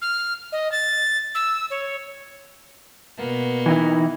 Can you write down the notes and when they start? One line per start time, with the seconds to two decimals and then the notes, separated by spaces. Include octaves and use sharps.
0.02 F6
0.52 D#5
0.72 A6
1.35 E6
1.70 C#5
3.18 B2 A#3 B3
3.66 E3 D#4 E4